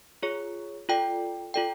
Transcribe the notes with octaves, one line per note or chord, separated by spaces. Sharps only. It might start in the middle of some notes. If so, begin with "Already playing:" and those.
F4 G#4 C#5
F4 A4 D5 G5
F4 A4 D5 G5